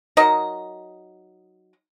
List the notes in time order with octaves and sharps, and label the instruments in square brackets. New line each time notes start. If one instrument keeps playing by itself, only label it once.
[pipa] F#3 D#4 A#4 D#5